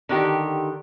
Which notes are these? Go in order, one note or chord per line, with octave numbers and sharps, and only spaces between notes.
D3 D#3 G4